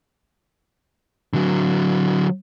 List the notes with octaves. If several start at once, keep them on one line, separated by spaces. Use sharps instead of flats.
D3 F#3